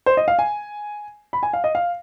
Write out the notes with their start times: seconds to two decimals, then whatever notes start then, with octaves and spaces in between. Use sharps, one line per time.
0.06 C5
0.17 D#5
0.28 F5
0.39 G#5
1.33 B5
1.43 G#5
1.53 F5
1.64 D#5
1.75 F5